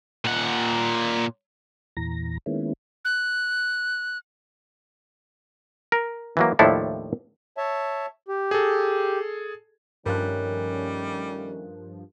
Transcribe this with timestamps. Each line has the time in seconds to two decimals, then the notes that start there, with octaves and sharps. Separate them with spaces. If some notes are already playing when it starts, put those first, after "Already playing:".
0.25 A#2 F#5
1.97 E2 A#2 E3 A#5 A#6
2.46 D#3 G#3 A#3 B3 C#4 E4
3.05 F#6
5.92 A#4
6.37 E3 F#3 A#3
6.59 D#2 A2 F3 D4 E4 A4
7.57 C#5 E5 A5
8.28 G4
8.51 G#4 A4
10.06 G2 D#3 F3 G3 A3 C#4 A#4 F#6